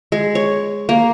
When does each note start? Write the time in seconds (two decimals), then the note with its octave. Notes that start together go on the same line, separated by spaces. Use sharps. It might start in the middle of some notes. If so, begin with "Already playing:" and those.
0.12 G#3
0.35 C#5
0.89 A#3